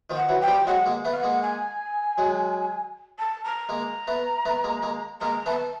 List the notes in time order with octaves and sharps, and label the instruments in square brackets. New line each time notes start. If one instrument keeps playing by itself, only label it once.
[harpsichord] D#3 F3
[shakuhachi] F#5
[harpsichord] E3 F#3
[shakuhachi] G5
[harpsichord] F3 G3
[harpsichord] F#3 G#3 [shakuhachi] F#5
[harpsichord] G#3 A#3
A3 B3
[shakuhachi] F5
F#5
[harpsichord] G#3 A#3
[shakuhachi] G#5
[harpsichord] F#3 G#3
[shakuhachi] A5
A#5
[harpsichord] G#3 A#3
A3 B3
A3 B3
G#3 A#3
G#3 A#3
[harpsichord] G#3 A#3 [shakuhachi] A#5
[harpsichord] A3 B3 [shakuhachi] A5